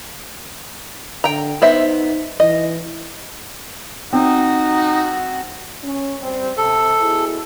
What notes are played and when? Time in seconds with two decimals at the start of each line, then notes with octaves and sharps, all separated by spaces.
1.24 D3 G5 A#5
1.62 B3 D#4 C5 E5
2.40 E3 D#5
4.13 C4 D#4 F#4
5.83 C#4
6.21 G3 C4
6.57 C3 A4
7.01 B2 E4 G#4